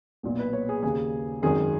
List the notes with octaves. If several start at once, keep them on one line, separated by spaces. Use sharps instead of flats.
B1 A#2
B4
C#5
G#4
D#2 C#3 G#4
G#1 F#2 D#3 G#4